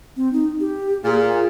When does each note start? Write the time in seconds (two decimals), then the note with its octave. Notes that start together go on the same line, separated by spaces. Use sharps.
0.17 C4
0.33 D#4
0.60 G4
1.04 A#2 G#4